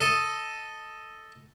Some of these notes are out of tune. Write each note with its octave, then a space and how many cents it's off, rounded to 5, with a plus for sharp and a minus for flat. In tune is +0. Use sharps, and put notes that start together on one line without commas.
A4 +0 D#5 +0